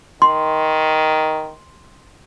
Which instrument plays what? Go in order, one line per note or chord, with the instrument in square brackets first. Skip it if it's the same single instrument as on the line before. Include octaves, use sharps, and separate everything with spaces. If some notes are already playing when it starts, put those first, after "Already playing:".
[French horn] D#3 [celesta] C6